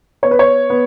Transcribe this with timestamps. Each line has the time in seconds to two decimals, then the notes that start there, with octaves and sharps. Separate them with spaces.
0.23 B3 C#5
0.31 B4
0.39 C#5
0.70 B3